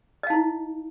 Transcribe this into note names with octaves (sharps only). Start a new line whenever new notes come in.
D#4 E4 D#5 F5